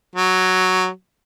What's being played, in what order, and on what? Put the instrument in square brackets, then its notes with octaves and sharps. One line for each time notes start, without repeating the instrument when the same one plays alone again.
[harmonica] F#3